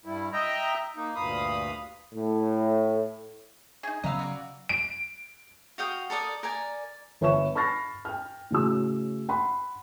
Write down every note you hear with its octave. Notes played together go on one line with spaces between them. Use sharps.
G2 G3 E4
D#5 E5 G5 A#5
A#3 D#4
D2 G2 A#2 F5 B5 D#6
A2
D#4 G#4
C#3 F#3 B3 C#4 D#5 F5 A#5 E6
F#4 B4 D5
D7
F#4 F5 G5 D#6
A4 A#4 D5 D#6
A#4 D5 G#5
G1 B4 C#5 E5 C#6 E7
B5 C#6 F6 A6 A#6 C7
G5 F6
A2 C#3 F#4 E6
F#5 B5 C6